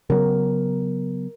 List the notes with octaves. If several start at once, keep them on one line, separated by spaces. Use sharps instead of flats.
C#3 F#3 B3 A#4